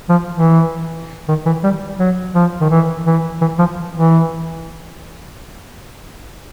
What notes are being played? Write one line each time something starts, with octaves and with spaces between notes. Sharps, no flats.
F3
E3
D#3
E3
G3
F#3
F3
D#3
E3
E3
E3
F3
E3